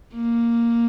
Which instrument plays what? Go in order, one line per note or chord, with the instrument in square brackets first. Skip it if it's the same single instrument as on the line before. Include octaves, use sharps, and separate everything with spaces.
[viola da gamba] A#3